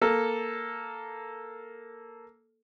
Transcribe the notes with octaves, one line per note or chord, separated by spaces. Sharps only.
A#3 A4